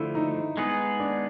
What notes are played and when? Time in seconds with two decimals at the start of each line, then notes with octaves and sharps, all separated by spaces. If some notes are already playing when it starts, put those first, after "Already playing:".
Already playing: D3 F3 A3 E4
0.15 D#4
0.57 G#3 B3 D#4 G#4 B4
1.00 D4